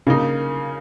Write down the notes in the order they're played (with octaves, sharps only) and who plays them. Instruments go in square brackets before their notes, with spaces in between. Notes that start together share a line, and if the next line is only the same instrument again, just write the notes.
[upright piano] C#3 A#3 D#4